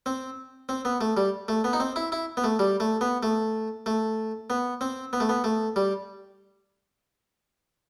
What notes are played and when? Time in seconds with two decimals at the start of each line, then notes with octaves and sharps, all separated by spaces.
0.06 C4
0.69 C4
0.85 B3
1.01 A3
1.17 G3
1.48 A3
1.64 B3
1.73 D#4
1.80 C4
1.96 E4
2.12 E4
2.37 B3
2.44 A3
2.59 G3
2.80 A3
3.01 B3
3.23 A3
3.86 A3
4.50 B3
4.81 C4
5.13 B3
5.20 A3
5.29 B3
5.44 A3
5.76 G3